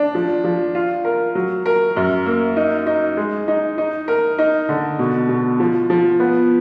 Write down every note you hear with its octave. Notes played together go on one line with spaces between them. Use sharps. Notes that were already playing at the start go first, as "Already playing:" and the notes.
Already playing: D4
F3
F3
F4
A#4
F#3
A#4
F#2
A#3
D#4
D#4
G#3
D#4
D#4
A#4
D#4
D3
B2
B2
F3
F3
B3